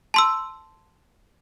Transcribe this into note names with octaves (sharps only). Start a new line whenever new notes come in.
A5 C6 E6